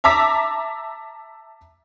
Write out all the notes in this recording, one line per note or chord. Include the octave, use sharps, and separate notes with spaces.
E5 A5 A#5 D6 E6 B6